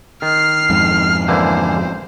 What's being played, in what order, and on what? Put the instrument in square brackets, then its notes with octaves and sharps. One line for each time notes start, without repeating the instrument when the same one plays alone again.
[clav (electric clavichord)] D#3 [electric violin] F6 C7
[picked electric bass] F2 G#2
[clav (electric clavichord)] D3 E3 A#3 [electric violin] C5